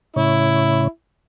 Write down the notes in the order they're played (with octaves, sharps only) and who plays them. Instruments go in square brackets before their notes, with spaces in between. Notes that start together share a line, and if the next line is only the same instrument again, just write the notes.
[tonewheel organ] A2 C#3 C#5 [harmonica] E4